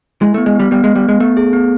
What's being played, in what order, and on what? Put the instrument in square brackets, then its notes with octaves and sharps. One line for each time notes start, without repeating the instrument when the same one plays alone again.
[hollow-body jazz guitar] G#3 [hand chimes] E4
[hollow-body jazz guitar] A3 [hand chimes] B3
[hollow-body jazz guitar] G#3
[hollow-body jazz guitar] G3 [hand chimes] B3
[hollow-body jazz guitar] G3 [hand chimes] B3
[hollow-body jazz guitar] G#3 [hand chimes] B3
[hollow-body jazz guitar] G3
[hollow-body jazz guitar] G#3 [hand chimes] B3
[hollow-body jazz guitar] A3 [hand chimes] B3
[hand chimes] G#4
B3